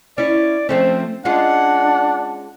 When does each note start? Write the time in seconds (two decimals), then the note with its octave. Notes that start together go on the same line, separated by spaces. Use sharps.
0.18 C#4 E4 D5
0.69 F3 A3 C4 C#4
1.25 G#3 C#4 D4 F4 F#5